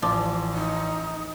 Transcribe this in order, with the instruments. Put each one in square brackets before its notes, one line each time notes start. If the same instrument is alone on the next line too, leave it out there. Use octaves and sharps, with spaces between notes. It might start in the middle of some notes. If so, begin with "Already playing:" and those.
[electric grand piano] A1 [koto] F3 [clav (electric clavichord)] D5
[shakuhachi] D#4